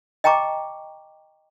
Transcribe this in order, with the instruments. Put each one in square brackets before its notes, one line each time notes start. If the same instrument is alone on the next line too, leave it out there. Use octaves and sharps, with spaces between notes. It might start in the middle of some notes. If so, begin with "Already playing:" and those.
[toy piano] D#5 G5 A5 A#5 C#6 D6